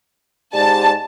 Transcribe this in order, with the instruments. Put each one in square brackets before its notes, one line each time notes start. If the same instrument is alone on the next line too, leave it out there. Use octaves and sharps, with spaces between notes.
[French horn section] G#2 G4 D5 [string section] A5